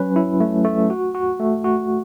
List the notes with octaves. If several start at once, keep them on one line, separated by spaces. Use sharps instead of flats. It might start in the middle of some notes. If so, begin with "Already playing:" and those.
Already playing: F#3 C#4 B4
E4
A3
A3
F#4
F#4
A3
F#4